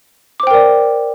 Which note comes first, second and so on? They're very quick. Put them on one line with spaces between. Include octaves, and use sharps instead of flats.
D6 C5 G5 A#4 D5